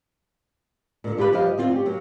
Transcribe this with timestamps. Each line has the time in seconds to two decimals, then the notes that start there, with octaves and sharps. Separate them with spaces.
1.04 A#2 D3
1.17 D4 F4 G4 A#4 B4
1.32 G2 F3 G4 D#5 F5
1.58 D2 C4 F4
1.73 C#4 G4
1.86 F#3 A#3